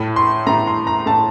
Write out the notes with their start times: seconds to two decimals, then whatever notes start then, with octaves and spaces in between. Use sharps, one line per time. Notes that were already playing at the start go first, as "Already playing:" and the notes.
Already playing: A2 A3
0.16 C6
0.47 A3 A#5
0.50 A2
0.67 C6
0.87 A#5
1.06 A2 A3 A5